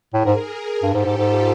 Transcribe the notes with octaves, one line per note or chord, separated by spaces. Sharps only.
A2 G#4 A#4
G#2
G2 G4 A4
G#2
G#2
G#2 F4 G4